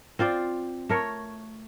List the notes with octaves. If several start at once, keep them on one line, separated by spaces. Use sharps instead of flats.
C4 F4 C5 D5
A3 A#4 C#5